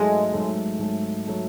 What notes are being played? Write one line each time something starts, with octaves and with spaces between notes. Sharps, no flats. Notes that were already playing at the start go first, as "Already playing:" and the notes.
Already playing: G#2 F#3 G#3 A3
G#2 F#3 A3
G#2 F#3 A3
F#3 A3